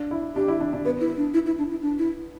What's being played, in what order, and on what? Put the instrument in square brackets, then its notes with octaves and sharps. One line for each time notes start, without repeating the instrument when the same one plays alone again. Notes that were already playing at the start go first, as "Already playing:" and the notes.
Already playing: [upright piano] D4
E4
[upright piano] D4 [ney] G4
[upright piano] E4
D4
D4
[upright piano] B3 [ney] B4
[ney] E4
D4
E4
E4
D4
E4
D4
E4